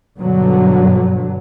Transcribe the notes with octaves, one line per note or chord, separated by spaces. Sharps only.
G2 B2 D3 F#3